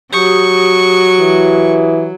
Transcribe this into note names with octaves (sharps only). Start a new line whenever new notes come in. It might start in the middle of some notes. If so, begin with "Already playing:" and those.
F#3 G4 C#6 D#6
E3